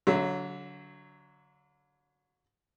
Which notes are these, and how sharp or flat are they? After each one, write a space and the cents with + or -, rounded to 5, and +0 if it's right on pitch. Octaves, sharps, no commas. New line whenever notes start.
D3 -30 F#3 +0 E5 +0